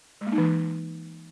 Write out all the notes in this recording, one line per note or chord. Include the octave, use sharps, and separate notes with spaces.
G#3
A#3
D#4
E3